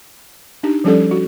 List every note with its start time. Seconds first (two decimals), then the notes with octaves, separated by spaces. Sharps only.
0.63 D4 D#4 G4
0.84 F3 G3 C#4 G4 A4 D5
1.11 F#4